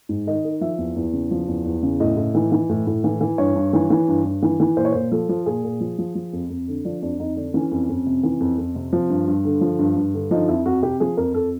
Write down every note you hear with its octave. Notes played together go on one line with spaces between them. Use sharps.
G#2
D#3 D#5
D#3
F3 E5
E2
E2
C#3
F3
E2
E2
C#3
A2 D#5
A2
E3
E3
A2
A2
E3
E3
G2 C#5
G2
E3
E3
G2
G2
E3
E3
A#2 C5
C#5
A#2 C5
F3 A4
F3
A#2 G#4
A#2
F3
F3
F3
F2
F2
D3
F3 D4
F2 D4
F2 D#4
D3 D4
E3 C#4
F2
F2
C3
E3
F2
F2
C3
F3
G2
G2
D3
F3
G2
G2
D3
F3 D#4
F2 E4
F2 F#4
C3 G4
F3 G#4
F2 A#4
F2 A4